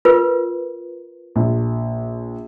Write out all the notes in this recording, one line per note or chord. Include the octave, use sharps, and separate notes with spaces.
F4 A#4 B4
A#1